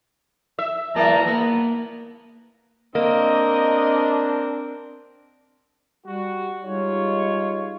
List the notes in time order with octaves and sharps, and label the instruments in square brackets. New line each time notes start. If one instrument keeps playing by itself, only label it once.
[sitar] E5
[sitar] E2 A#3 [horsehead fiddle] A5 A#5
[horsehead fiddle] A#3 [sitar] B3
[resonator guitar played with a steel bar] A#3 [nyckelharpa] C4 A#4 [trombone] D4 [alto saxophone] D#5
[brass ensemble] G3 F#4
G3 G#3 D#4 F4 C#5